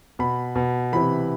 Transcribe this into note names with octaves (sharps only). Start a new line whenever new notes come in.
B2 B5
B2
C3 E3 B5